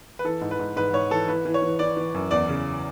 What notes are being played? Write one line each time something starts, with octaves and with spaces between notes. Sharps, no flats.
B4
E3 A4
G#2
B4
G#2
G#2 B4
G#2 C#5
E3 A4
E3 B4
E3
C#5
E3
E3 D5
E3
F#2
E2 D5
C#3